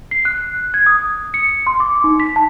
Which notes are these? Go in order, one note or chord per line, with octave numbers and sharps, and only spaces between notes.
C7
F#6
G#6
D#6
C#7
C6
D6
D#4
B6
A5